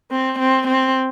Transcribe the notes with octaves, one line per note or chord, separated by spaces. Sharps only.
C4
C4
C4